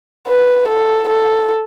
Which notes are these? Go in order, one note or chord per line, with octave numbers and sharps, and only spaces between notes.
B4
A4
A4